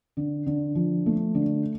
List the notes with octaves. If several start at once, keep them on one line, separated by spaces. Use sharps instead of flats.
D3
D3
F3
A3
D3